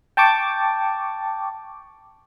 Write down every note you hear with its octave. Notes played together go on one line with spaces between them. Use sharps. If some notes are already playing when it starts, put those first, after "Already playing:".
G5 A5 C#6 D6